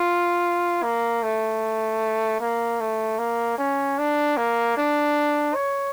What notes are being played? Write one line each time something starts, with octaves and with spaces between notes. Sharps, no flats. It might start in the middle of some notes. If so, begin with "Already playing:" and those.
Already playing: F4
A#3
A3
A#3
A3
A#3
C#4
D4
A#3
D4
C#5